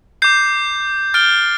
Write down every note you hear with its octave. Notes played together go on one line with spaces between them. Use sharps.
D6 G6 C7
F6 A6 D7 G7